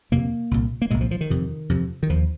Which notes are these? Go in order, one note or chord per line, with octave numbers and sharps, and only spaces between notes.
F2 C3 A#3
C2 A#2
A#3
C2 A#2 G#3
F3
F3
D#3
F2 C3
F2 C3
D#3
D#2 F3